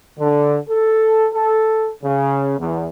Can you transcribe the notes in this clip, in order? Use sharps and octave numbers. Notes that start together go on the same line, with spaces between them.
D3
A4
A4
C#3
E2